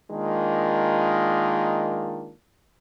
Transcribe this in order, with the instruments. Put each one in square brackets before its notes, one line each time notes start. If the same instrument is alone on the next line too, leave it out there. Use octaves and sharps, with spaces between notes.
[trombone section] D#3 G#3 A#3 D4 F4